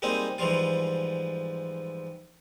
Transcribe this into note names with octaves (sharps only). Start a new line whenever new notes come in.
G3 G#3 A#3 C4 D#4
G#2 E3 F3 G3 F4